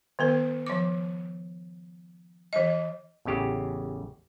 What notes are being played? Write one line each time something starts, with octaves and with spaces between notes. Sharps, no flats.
D#3 B3 A#4
F3 D6
E3 D#5
A1 E2 C#3 G4